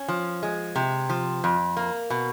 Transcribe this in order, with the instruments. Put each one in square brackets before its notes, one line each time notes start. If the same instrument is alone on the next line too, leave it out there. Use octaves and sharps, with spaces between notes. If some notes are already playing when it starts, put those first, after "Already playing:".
Already playing: [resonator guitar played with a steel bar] C#4
F3
G#3
C3
F3
F2
A#3
B2